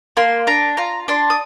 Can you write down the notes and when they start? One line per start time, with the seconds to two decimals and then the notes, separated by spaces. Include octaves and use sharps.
0.17 A#3 C6
0.47 D4 A#5
0.77 F4 A#5
1.08 D4 C6
1.30 D#6